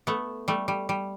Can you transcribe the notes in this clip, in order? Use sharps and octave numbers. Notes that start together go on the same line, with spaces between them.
A3 B3
G3 A3
G3
G3